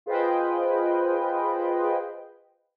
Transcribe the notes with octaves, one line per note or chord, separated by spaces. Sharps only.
F4 G#4 B4 C5 D#5 G5